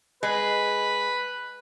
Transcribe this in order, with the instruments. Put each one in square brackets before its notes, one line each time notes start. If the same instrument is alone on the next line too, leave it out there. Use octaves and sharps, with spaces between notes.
[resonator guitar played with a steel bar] G#3 [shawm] B4